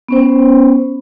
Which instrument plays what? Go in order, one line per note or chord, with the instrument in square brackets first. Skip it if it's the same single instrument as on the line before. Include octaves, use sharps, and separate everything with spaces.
[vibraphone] B3 C#4 C5